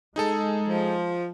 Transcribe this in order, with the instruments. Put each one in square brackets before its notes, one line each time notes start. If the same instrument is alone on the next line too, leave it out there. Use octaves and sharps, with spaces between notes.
[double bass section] G#3 [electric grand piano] D#4 G#4 A4
[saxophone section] F3